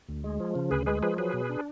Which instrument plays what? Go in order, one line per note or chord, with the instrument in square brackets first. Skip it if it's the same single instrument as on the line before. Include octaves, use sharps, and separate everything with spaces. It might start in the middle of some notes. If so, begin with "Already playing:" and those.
[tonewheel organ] D2
G#3
F3
C#3
D2 G#4 B4
G#3 G#4 B4
F3 G#4 B4
F#3 G#4 B4
B2
D4